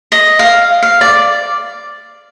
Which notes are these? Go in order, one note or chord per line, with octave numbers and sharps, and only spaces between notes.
D#5
F5
F5
D5